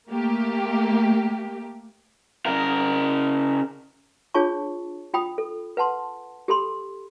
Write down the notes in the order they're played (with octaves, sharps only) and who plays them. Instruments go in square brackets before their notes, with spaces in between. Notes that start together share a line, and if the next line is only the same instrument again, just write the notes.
[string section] A3 A#3 G4
[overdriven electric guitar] C#3 A#4
[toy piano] D4 F4 G#4 C#5 A5 C#6
F4 G5 B5 D#6
A4
B4 F#5 A5 C6
G4 A4 B5 C6